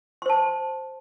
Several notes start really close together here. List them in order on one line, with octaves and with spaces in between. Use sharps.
C6 C5 A5